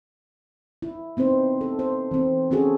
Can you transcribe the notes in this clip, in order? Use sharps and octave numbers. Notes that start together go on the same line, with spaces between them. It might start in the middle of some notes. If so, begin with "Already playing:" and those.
E4
B3 C4 D#4 C5
A4
C5
E3 C4
C4 C#4 F#4 G#4 A4